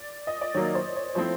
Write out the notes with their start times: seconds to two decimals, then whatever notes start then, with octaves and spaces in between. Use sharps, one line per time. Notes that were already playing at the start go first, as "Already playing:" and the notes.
Already playing: D5
0.27 D#5
0.41 D5
0.54 D#3 F#3 A#3 C#5
0.75 C5
0.96 C#5
1.15 F3 A3 C4 E4 C5